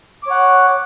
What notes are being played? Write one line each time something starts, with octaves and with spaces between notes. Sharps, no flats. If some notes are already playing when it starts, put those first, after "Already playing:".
C#5 F#5 D6